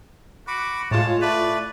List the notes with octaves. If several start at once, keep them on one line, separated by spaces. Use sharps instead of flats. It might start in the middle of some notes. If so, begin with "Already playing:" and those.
F#4 B5 D6
A2 G#3 F4 C#5 A5
A3 B4 D5